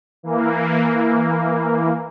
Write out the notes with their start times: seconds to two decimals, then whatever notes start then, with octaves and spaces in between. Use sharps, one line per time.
0.23 E3 A#3